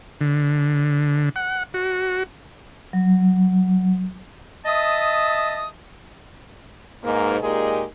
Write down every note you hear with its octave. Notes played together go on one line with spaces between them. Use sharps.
D3
F#5
F#4
F#3
D#5 E5 A5 D#6
G#2 B2 A#3
A#2 G#3 D#4 G4 G#4 A#4